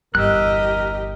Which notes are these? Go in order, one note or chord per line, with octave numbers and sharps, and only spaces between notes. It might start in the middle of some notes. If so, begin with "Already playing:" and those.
G1 E2 G4 A#4 D#5 E6 F#6